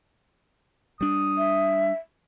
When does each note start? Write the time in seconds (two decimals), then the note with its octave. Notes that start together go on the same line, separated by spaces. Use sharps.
1.01 G3 D4 D#6
1.38 E5